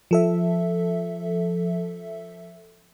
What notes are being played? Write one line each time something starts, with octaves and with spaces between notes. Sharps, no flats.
F3 A4 E5